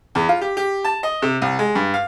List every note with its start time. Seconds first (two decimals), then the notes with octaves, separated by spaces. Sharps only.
0.15 E2
0.29 F4
0.41 G4
0.57 G4
0.84 A5
1.03 D#5
1.22 C3
1.42 C2
1.59 G#3
1.75 G2
1.94 F5